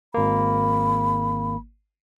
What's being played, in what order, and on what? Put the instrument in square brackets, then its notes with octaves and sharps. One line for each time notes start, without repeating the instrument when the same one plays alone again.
[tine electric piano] G#1 A#3 [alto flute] B5